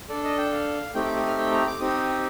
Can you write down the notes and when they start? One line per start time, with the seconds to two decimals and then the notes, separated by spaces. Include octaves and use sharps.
0.09 D4 A4 D5
0.24 D#5
0.38 G5
0.52 F5
0.94 A3 C4 D#4 G4 G5
1.05 D6
1.16 D#6
1.27 F6
1.38 G5
1.52 A#5
1.67 D6
1.80 C4 D#4 G4 D#6